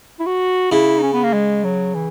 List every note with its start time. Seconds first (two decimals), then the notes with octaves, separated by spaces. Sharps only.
0.20 E4
0.26 F#4
0.72 C#3 E4
0.98 D#4
1.02 C#4
1.14 B3
1.23 A#3
1.33 G#3
1.64 F#3
1.95 E3